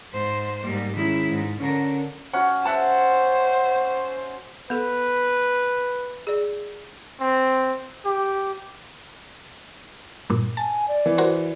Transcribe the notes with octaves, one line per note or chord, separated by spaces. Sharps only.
G#2 C5
G#2 G3 A#3
D#3 G#3 C#4 E4
G#2
D3 C#4 A#4
C#4 F#4 F#5
C5 E5 F#5 A5
B3 A4 B4
G#4 D5
C4
G4
G2 A#2
G#5 A5
D5
E3
F#4 A#4 C5